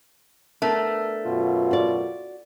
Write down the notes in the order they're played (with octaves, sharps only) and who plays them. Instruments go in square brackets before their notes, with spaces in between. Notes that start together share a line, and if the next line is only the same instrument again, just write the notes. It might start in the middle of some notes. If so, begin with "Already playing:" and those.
[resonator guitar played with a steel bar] A3 [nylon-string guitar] B3 D4 A#4
[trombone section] F#2 B2 F4
[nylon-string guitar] F#4 D5